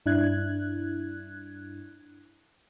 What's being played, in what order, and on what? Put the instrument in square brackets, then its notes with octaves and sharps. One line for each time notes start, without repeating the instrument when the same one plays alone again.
[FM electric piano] G2 D4 E4 F#6 G#6